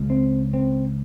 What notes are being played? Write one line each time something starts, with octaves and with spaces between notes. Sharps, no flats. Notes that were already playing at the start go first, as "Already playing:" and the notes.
Already playing: C#2 C#3
C4
C4